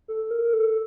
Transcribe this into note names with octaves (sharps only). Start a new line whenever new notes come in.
A4
A#4
A4